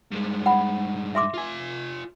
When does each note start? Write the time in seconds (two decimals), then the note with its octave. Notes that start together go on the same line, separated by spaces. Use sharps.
0.12 G2 G#3
0.46 F#5 B5
1.15 E5 C6 D6
1.34 F4 G#5